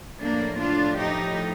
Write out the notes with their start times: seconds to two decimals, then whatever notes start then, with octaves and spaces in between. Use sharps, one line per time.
0.21 A2 F3 A#3 D4
0.60 D4 F4
0.99 D#4 G4